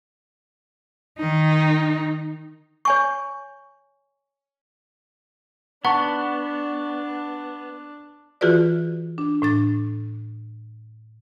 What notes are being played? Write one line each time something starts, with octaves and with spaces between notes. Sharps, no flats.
D#3 D#4
C#5 G#5 C#6
B3 D4 F#5 A5 C#6
E3 F4 F#4 G#4 B4 D5
D4
A2 D4 A6